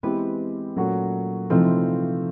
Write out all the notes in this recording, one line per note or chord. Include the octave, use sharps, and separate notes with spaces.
E3 G#3 B3 C4 E4 G4 B4
A#2 F#3 A3 C#4 F#4
C3 E3 F3 A3 C4 D#4 F4